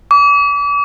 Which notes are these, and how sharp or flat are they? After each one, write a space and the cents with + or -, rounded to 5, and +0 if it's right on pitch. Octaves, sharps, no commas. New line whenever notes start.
D6 -40